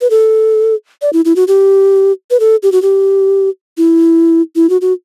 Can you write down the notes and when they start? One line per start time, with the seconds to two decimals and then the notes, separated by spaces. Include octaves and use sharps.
0.01 B4
0.10 A4
1.02 D5
1.13 E4
1.25 E4
1.36 F#4
1.48 G4
2.31 B4
2.40 A4
2.63 G4
2.72 F#4
2.82 G4
3.77 E4
4.56 E4
4.70 F#4
4.81 F#4